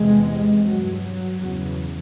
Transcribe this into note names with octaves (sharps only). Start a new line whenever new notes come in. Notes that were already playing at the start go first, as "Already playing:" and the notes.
Already playing: E2 C3 G#3
G2 F#3
F#3
E2 C#3